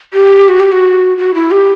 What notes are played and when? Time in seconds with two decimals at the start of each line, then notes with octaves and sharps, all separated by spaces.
0.13 G4
0.48 F#4
0.60 G4
0.72 F#4
1.17 F#4
1.34 E4
1.51 G4